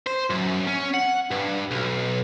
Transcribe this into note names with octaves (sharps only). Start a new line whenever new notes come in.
C5
F#2
C#4
F#5
G2
B1